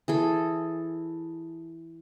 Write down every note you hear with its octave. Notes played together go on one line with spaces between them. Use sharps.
E3 G#4 A4